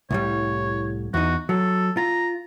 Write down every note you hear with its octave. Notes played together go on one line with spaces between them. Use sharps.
C2 A2 G3 C#5
E2 D#4 F#4
F#3 A4
F4 A#5